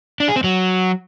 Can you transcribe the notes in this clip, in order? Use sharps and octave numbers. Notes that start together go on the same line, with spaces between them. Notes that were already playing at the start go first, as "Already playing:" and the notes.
D4
G#4
C4
F#3